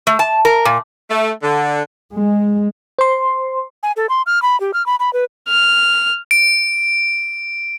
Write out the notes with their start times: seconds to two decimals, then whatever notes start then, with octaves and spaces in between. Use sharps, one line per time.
0.07 A3
0.19 A5
0.45 A#4
0.65 A#2
1.10 A3
1.43 D3
2.13 G#3
2.99 C5 C6
3.83 G#5
3.96 A4
4.09 C6
4.26 F6
4.42 B5
4.60 G4
4.74 F6
4.86 B5
5.00 B5
5.13 B4
5.49 F6
6.31 D7